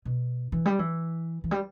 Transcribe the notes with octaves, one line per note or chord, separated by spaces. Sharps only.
B2
E3
G3
E3
E3
G3